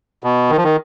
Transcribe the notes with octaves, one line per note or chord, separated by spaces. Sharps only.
B2
D#3
F3
D#3